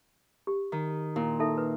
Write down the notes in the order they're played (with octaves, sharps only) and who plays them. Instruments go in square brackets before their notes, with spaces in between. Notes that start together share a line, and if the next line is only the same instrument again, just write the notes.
[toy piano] G4
[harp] D#3
[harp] A#2 [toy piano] E4
[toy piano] D#4 A4 E5
B4